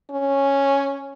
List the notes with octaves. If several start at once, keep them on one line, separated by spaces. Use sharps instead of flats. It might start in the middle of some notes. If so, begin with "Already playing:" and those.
C#4